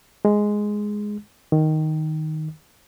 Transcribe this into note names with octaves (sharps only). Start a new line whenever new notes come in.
G#3
D#3